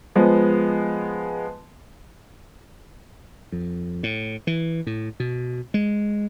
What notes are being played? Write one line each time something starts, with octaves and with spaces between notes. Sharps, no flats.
F3 G#3 B3
F2
A2
E3
A2
B2
G#3